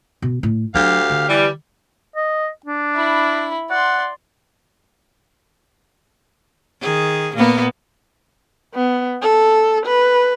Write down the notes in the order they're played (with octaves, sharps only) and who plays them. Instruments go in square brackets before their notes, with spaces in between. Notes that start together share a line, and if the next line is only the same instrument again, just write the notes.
[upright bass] B2
A2
[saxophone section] D2 G4 F5 [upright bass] F#3 D4
[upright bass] D3
[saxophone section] E3 G3
[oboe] D#5
D4
[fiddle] E4 B5
[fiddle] D5 C6 [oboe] F#5
[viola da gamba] D#3 G#4
A#2 A#3 B3
[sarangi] B3
A4
B4